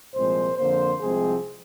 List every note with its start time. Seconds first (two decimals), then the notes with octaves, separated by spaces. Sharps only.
0.15 C2 A#2 F3 G#3 C4 C5
0.58 F2 D3 F3 A#3 C5
1.01 C2 C3 F3 G#3 C4 G#4